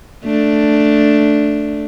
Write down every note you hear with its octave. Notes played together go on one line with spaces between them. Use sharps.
A3 D4